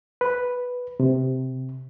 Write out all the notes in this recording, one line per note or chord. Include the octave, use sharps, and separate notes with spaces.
B4
C3